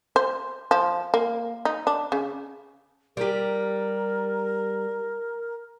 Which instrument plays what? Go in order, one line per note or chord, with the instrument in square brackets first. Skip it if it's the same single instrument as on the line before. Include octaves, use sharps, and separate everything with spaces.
[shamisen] C5
F3
A#3
D#4
D4
C#3
[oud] G3 G4 [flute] A#4